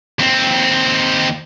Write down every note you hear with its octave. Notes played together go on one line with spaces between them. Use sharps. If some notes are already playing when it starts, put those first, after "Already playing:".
D#2 C4